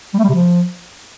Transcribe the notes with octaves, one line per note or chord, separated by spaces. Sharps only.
G3
A3
G3
C3
F3